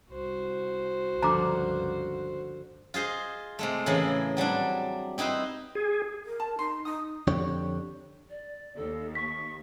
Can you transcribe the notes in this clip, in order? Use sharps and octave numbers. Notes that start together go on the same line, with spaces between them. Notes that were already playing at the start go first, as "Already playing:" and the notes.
C2 F#4 C5
C#2 G2 D3 F3 A#5 D6
F4 G#4 C5 D#5
C3 G#3 A3
A2 C#3 E3 A#3 E4 G#4
F#3 G3 C4 D4
C4 D#4 E4 B4 C5
G#4
A#4
A5
D#4 C6
D#4 D#6
F2 D3 D4 G4 C#5
D5
D#2 A4
C#6 B6